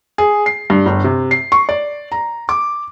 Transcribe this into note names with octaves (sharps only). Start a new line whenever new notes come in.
G#4
C7
G2
G1
C3
C7
C#6
D5
A#5
D6